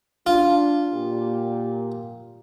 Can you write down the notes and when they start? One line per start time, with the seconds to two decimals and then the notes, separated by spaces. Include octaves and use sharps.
0.26 D4 F4
0.94 A#2 G4